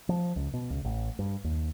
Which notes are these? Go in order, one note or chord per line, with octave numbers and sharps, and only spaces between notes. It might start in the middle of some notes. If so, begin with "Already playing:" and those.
F3
C#2
B2
C#2
A1
G2
D#2